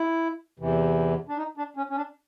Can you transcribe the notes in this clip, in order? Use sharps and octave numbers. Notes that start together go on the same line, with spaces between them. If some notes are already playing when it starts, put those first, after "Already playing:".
Already playing: E4
E2 C3 E3
D4
D#4
D4
C#4
C#4
D4